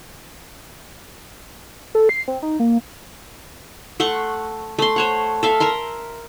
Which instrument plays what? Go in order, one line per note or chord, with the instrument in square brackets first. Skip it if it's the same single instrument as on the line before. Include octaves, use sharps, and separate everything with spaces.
[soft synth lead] A4
C7
C4
D#4
A#3
[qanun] A3 F#5 C6 C#6
A3 C6
C5 C#5 F#5
A4 E5 F5
A#4 E5 A#5 C6